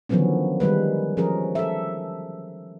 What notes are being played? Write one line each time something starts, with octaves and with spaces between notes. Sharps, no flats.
D3 D#3 F3 F#3 B3 C#4
D#3 G3 G#3 B4
F3 C#4 G#4 A#4
A4 E5